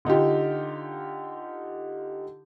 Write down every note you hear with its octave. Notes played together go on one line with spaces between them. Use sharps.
D3 D#4 F4 G4